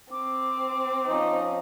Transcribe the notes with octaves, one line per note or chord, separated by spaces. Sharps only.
C4 D6
F3 C#4 D#4